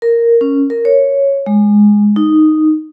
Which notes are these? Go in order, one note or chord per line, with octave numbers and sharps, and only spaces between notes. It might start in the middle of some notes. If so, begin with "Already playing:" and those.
A#4
C#4
A#4
C#5
G#3
D#4